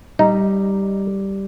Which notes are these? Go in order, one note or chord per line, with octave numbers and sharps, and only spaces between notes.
G3 D#4